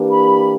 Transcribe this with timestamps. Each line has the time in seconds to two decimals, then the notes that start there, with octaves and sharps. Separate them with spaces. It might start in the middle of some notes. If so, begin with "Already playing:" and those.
Already playing: E3 A#3 D4 G4 B4
0.12 B5